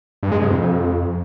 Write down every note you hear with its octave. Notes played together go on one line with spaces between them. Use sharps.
G2
G#3
C3
F2